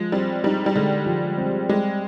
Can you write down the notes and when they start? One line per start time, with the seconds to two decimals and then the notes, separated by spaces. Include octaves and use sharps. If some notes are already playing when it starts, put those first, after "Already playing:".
Already playing: F3 G#3
0.12 G3 C4
0.44 G3 D#4
0.66 G3
0.75 D3 G#3
1.06 F3
1.38 C4
1.69 G3 G#3